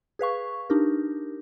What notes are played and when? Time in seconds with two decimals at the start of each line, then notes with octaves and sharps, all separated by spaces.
0.19 G#4 B4 F5 C#6
0.70 D4 D#4 G4 A#4